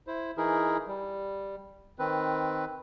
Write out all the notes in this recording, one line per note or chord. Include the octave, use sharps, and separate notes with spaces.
E4 C5
E3 D#4 E4 G#4 A#4
G3
D#3 C4 B4